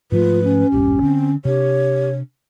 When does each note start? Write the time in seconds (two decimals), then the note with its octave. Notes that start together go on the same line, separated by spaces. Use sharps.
0.12 G#2 F3 A3 F4 B4
0.43 C#4
0.72 E1 A#1 G2 G4
1.02 D3 C4
1.45 C3 D4 G4 C#5